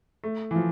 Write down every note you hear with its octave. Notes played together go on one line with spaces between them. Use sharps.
A3
E3
F3